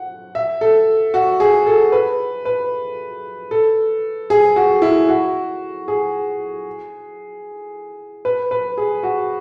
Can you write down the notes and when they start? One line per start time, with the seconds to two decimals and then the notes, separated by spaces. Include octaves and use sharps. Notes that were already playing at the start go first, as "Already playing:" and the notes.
Already playing: F#5
0.35 E5
0.61 A4
1.14 F#4
1.40 G#4
1.67 A4
1.92 B4
2.45 B4
3.51 A4
4.30 G#4
4.56 F#4
4.82 E4
5.09 F#4
5.88 G#4
8.25 B4
8.51 B4
8.77 G#4
9.03 F#4